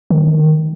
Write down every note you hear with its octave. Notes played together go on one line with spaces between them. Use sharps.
D#3